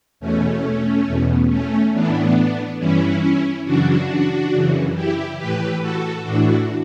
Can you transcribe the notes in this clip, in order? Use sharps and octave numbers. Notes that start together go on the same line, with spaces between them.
E2 B2 A3 C#4
E2 B2
A3 C#4
A2 E3 B3 D4
G2 E3 C#4 E4
F#2 C#3 E3 D4 F#4
F#2 C#3 E3
E4 G4
A2 E3 G4 B4
F#4 A4
A2 E3 D4 F#4